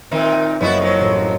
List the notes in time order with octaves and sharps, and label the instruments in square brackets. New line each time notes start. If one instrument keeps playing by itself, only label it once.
[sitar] A#2 D#3 D#4 [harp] C4 E5
[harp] G5
[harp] F#1 C#5 D#5 [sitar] B3 E4 F#4
[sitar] F2 F3 F#3
[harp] A1